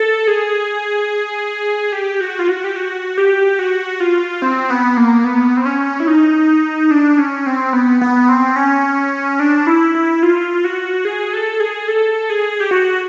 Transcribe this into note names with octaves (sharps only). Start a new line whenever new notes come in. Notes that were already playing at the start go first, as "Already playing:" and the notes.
Already playing: A4
G#4
G4
F#4
F4
F#4
G4
F#4
G4
F#4
F4
C4
B3
A#3
B3
C4
C#4
E4
D#4
D4
C#4
C4
B3
B3
C4
C#4
D4
E4
E4
F4
F#4
G#4
A4
G#4
A4
G#4
G4
F#4